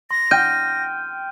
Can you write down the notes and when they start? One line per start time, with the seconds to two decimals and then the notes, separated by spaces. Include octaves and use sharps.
0.11 C6 A#6
0.31 G5 F6 G6 D#7